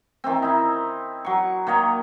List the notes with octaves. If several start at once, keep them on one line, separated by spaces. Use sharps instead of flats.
D#3 E3 C4
D#4 E4
F#3 C#6
D#3 A#3 C#5 D#5